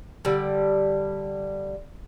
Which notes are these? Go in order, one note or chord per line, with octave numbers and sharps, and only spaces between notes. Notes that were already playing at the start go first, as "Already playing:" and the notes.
D3 G3